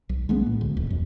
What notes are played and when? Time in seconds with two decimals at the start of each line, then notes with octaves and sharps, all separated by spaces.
0.09 B1
0.29 G#3 A#3 B3 C#4
0.46 A2
0.61 D2
0.77 D1
0.90 F2